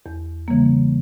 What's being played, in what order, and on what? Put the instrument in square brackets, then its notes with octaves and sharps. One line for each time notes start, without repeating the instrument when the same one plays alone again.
[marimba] E2
C#3 E3 G3 A#3